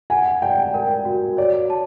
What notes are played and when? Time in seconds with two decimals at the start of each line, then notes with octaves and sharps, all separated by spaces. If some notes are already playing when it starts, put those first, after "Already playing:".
0.10 F#5 G#5
0.42 D5 G5
0.74 A#4 G5
1.05 F#4
1.37 C#5 D5
1.70 A5